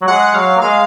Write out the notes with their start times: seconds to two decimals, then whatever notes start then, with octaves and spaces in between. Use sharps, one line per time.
0.02 F#3
0.08 G#3 F#5
0.34 F#3 F5
0.57 A#3
0.61 G#3 F5